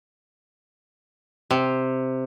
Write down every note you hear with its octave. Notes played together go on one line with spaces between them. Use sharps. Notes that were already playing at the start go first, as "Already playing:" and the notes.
C3